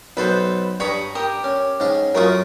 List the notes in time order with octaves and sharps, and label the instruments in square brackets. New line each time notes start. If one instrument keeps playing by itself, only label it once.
[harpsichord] B1 A4 [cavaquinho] B4 C5
[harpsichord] G2 A#5 B5 [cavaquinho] C#5 D#6
[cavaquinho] G4 A#4 D#6
[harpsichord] C#4
G#2 C#4 G#4
[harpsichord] F#2 A3 F4 [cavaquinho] A#4 C#6 D#6